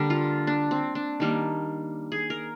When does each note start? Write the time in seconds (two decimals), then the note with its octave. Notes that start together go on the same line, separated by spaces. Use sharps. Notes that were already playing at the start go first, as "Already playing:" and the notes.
Already playing: D3 G3 A#3
0.10 F4
0.47 D4
0.71 C4
0.95 D4
1.20 D#3 G3 A#3
2.12 G#4
2.30 A#4